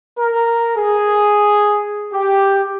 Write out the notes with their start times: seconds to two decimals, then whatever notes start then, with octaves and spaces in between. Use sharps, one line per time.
0.19 A#4
0.78 G#4
2.14 G4